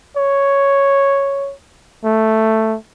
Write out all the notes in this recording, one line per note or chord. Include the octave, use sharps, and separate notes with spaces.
C#5
A3